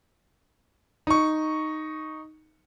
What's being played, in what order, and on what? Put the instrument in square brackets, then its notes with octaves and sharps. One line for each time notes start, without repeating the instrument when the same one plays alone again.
[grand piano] D#4 C#6